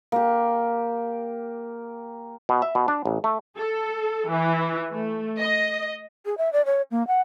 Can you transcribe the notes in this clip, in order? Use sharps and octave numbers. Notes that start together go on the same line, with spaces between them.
A#3 G4
B2
E5
B2
D4
A1
A3
A4
E3
A3
D#5
G#4
E5
D5
C#5
A#3
F#5